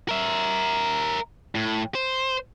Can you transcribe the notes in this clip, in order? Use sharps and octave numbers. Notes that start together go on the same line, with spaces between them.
A#4 E5
A2
C5